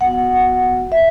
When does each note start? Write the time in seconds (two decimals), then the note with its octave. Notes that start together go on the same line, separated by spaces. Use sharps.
0.01 B3 F#4 F#5
0.92 E5